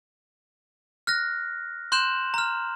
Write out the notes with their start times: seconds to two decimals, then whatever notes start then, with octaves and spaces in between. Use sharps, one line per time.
1.07 F6 F#6 A#6
1.92 C6 F#6 G6 E7 F#7
2.34 A#5 F6